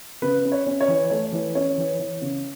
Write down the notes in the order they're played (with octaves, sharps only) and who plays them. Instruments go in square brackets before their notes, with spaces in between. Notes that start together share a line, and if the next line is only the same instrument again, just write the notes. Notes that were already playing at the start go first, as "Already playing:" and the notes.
[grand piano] C#3 B4
C#4
C#5
C#4
C#5
E3
A3 C#5
E3
C#4 C#5
E3
E3
C#3